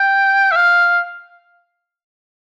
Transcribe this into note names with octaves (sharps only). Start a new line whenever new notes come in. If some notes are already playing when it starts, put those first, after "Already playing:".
Already playing: G5
E5
F5